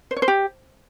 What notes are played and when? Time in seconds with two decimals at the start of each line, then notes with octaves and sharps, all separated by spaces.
0.11 C5
0.17 C#5
0.22 C5
0.28 G4